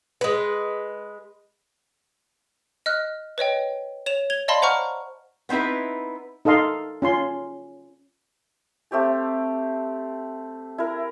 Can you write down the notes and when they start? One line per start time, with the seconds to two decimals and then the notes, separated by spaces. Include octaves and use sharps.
0.21 G#3 B4
2.86 D#5 F6 F#6
3.38 B4 C#5 D#5 G5
4.06 C#5 E7 F7
4.30 G#6 F7 G7
4.48 D5 D#5 F5 A5 B5 C6
4.62 C5 F#5 A#5 C#6 F6
5.49 B3 C4 D#4 E4 B4
6.45 D#4 A4 D#5 F5 C6
7.02 C#4 F4 C6
8.91 A3 C4 G4 A5
10.78 E4 A#4